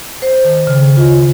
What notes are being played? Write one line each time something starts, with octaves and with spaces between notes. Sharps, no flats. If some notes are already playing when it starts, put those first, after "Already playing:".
C5
D#3
C#3
F4